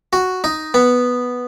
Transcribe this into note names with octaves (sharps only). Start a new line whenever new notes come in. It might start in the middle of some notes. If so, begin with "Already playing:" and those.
F#4
D#4
B3